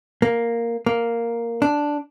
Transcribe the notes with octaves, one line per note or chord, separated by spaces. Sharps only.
A#3
A#3
D4